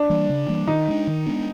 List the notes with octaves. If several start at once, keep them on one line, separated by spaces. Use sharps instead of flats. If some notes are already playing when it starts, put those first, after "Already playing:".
Already playing: D4
E3 G3 A#3
C#3
E3 G3 A#3
D#3 D#4
G#3 B3 D4
D#3
G#3 B3 D4